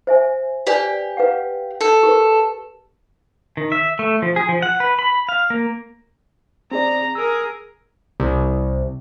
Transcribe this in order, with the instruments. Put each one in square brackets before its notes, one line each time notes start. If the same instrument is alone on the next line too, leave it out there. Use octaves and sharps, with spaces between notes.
[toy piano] C5 E5 G#5
[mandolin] G4 [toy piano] B4 D5 G#5
[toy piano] B4 F5 F#5
[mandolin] A4
[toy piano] G4 A#4 B4
[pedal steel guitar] D#3
E5
A3
F3
G#4
F3
F#5
B4
B5
F5
A#3
[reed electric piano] C4 G#4 D5 [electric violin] A#5
[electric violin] G#4 A#4 [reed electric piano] E6
[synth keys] C2